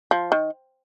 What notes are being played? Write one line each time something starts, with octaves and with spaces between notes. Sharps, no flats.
F3
D#3